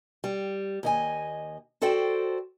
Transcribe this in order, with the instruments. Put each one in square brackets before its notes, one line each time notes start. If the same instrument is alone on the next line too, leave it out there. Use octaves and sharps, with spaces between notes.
[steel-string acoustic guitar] G3
D#2 D#5 G#5
F#4 A4 C5 D5 G5